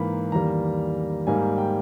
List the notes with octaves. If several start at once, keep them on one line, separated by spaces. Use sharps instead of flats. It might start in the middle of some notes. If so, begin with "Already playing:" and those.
Already playing: G#2 E3 A#3 B5
E2 D#3 G3 A#3 A#5
G#2 G3 A#3 G#5
G5